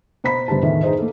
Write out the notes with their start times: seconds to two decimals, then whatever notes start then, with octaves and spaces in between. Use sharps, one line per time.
0.24 B2 C5 A#5 B5 B6
0.48 G1 G3 C5 A5
0.62 E2 A2 D#3 E3
0.83 D#4 G#4 B4 C5 D#5
0.99 A#3 A4